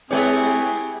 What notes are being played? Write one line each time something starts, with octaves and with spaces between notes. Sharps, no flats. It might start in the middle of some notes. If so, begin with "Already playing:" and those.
G#3 C4 E4 G4 G#4 B4 C#5